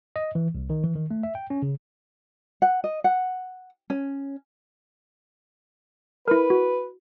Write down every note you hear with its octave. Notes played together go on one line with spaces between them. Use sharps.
D#5
E3
C2
D#3
E3
D#3
A3
E5
G5
C#4
C#3
F#5
D#5
F#5
C#4
E4 A#4 B4
F#4